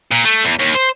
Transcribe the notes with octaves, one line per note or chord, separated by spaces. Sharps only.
A#2
A3
E2
D#2
C5